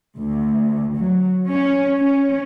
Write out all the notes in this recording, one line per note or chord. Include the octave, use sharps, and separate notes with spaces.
D2
F#3
C#4
C#4